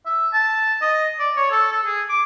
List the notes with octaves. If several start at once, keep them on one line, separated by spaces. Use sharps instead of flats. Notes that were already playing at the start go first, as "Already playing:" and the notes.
E5
A5
D#5
D5
C#5
A4
A4
G#4
D6